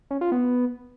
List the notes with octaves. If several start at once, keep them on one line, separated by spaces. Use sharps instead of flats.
C#4
F4
B3